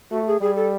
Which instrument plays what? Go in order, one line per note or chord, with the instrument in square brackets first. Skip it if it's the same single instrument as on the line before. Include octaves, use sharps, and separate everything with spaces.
[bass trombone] A3 [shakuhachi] F#4
[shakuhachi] G#4
[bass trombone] G3 [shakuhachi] G#4
[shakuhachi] A4